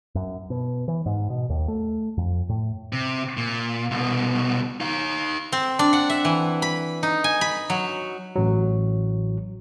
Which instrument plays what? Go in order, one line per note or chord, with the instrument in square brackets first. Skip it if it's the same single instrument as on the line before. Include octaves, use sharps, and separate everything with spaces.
[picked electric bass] F#2
B2
E3
G#2
B2
D#2
A3
F2
A2
[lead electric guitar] C3
A#2
C2 B2
D#4 F5
[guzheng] C4
D4
F#5
E5
E3
B5
D#4
G#5
B5
F#3
[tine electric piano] A1 F#3